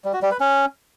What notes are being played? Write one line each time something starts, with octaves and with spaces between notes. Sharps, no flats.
G3
F#4
G3
B4
C#4